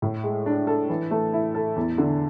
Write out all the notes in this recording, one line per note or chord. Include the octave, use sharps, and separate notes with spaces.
A2
G#3
D4
A4
E3
A3
E4
A4
E2
D3